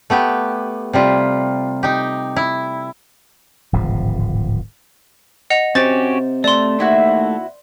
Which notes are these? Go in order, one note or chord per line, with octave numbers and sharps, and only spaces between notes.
A3 B3 G4
C3 G3 F4
D#4 G4
E4
D1 G#1 C3 F3
D#5 F#5 F7
C3 C#4 F#4 G4 C5 A6
A3 D5 C6
D#2 C4 E4 F#4